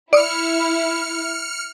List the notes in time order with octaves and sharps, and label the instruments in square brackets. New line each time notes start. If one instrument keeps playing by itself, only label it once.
[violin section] E4 [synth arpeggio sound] D5 D#6 [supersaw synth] F6 C#7